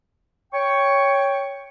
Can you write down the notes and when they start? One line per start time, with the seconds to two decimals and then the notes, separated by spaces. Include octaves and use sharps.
0.53 C#5 G5 C#6